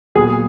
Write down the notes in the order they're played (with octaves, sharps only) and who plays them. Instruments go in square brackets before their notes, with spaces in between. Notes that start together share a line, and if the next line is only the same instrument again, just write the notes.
[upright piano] A#2 F#3 B3 [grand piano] G#4